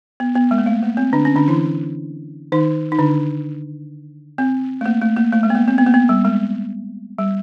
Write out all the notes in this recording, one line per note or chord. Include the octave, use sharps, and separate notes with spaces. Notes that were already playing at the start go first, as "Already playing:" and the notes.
B3
B3
G#3
A#3
A3
A#3
C4
D3 D4
C#4
D3 D4
E3 E4
D#3 D#4
D#4
D3 D4
C4
A3
A#3
A3
A#3
A3
G#3
B3
A#3
C4
B3
A#3
B3
G3
G#3
G3